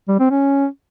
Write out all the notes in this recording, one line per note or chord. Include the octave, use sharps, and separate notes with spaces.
G3
C4
C#4